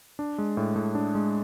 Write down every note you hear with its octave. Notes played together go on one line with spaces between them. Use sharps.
D4
G#3
A2
A2
D4
G#3